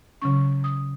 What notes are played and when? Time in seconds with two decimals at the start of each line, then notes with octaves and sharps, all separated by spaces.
0.22 C#3 F#3 C#4 C#6
0.64 D#6